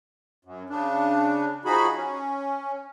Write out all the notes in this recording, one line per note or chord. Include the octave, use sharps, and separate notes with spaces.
F#2
C#3 D4
F3 D#4 F#4 G#4 B5
C#4